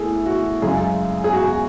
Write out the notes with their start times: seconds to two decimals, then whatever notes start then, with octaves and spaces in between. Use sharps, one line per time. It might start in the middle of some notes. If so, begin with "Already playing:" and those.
Already playing: A2 E3 G#4 A4
0.26 F#4
0.62 F#2 C#3 G#3 G#4
1.24 G#4
1.33 F#4